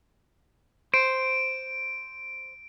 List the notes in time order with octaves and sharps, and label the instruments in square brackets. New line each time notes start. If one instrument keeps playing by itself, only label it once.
[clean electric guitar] C5 [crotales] D7